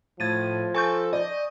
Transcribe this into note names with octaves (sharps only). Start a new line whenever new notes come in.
A2 F3 G#6 A6 D#7
A4 G#5 C#6 G6
D5 D#5